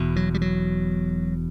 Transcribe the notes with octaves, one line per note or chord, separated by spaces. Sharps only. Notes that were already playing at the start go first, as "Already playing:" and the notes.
Already playing: E1 E2 B2
F#3
G3
F#3